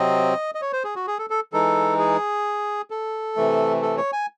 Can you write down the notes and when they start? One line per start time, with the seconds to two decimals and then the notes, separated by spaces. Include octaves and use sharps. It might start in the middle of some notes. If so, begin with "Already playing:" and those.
Already playing: C3 F#3 C4 D#5
0.55 D#5
0.61 C#5
0.73 C5
0.84 G#4
0.96 F#4
1.07 G#4
1.19 A4
1.30 A4
1.53 E3 G#3 D#4 A4
1.99 G#4
2.90 A4
3.36 C3 E3 A3
3.82 A4
3.97 C#5
4.13 G#5